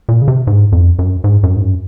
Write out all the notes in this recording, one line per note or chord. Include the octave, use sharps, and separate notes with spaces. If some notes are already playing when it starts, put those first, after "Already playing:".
A#2
C#3
C3
G#2
F2
F#2
G#2
F#2
G#2
F#2